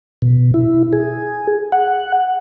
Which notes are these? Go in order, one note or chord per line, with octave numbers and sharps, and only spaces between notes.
B2
E4
G#4
F#5